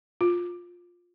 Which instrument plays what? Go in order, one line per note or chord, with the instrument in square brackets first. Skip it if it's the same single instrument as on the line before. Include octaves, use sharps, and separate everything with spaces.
[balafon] F4